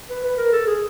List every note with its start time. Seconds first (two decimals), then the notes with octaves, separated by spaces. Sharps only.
0.10 B4
0.24 B4
0.38 A#4
0.53 A4
0.67 G#4